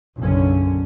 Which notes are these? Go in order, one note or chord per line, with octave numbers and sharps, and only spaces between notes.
F#1 B1 D3 C#4